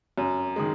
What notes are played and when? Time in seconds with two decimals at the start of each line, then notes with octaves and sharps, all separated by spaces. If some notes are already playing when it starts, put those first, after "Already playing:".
0.18 F#2
0.56 D#3 G#3